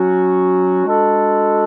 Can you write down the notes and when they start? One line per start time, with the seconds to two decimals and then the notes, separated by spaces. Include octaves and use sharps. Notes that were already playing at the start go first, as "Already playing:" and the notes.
Already playing: F#3 C#4 F#4
0.86 G#3 D4 F#4 A4